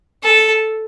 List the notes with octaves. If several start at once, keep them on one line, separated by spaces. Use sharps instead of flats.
A4